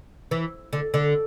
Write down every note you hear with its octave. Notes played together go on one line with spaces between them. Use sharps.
E3
D3
D3